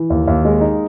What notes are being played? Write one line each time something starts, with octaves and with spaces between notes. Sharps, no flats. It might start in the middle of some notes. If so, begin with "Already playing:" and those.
Already playing: E3
D#2
D#2
G#3
D#4